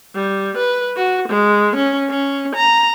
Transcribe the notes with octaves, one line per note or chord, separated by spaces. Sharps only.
G3
B4
F#4
G#3
C#4
C#4
A#5